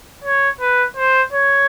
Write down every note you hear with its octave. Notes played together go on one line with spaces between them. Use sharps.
C#5
B4
C5
C#5